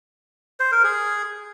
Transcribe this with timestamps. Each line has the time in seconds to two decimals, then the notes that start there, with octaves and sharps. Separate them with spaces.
0.60 C5
0.72 A#4
0.84 G#4